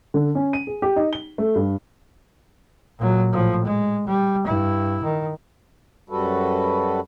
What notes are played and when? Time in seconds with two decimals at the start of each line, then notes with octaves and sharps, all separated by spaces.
0.14 D3
0.35 C#4
0.53 D#7
0.67 G#4
0.82 G4
0.96 D#4
1.13 G7
1.38 A3
1.56 G2
2.99 A#2 F#3
3.32 A2 F3
3.65 G#3
4.07 G3
4.45 G2 E4
5.04 D#3
6.10 F#2 G3 F#4 A4 B4